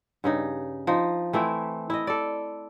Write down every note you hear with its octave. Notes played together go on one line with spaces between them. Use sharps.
G2 C#3 D#4
F3 D#4
E3 A3 C4 E4
E4 D#5
A4 D5